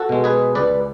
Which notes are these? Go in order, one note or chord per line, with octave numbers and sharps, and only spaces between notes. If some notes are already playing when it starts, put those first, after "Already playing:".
Already playing: F#4 A4
B2 G#3
G#4 B4
C#2 B4 D5